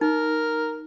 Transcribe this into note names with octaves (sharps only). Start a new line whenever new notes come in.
D#4 A#4